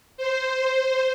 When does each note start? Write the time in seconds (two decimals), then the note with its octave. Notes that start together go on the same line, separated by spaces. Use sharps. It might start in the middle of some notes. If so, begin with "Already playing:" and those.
0.17 C5